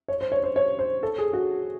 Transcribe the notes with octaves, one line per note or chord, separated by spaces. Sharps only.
C#5
C5
C#5
C5
C#5
C5
A4
G#4
F#4